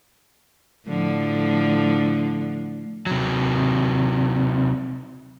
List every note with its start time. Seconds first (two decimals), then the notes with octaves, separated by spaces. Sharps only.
0.88 A2 D3 F3
3.06 C3 F#3